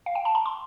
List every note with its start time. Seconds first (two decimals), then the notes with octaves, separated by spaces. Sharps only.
0.06 F5
0.15 G5
0.25 A5
0.35 A#5
0.46 C6